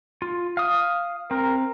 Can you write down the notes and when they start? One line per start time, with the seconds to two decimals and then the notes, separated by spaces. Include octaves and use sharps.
0.22 F4
0.57 F5 D#6
1.31 C4 A#4